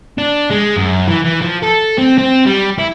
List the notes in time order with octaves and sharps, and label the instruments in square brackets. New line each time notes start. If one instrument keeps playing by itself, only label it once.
[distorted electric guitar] D4
G#3
F#2
E3
E3
F3
A4
C4
C4
G3
E4